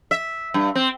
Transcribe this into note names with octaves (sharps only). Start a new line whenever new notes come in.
E5
G2
C4